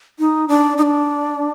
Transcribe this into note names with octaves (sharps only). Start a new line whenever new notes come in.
D#4
D4
D#4
D4